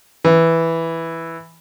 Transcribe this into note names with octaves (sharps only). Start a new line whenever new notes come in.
E3